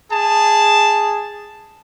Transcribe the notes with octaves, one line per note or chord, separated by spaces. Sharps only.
G#4 A5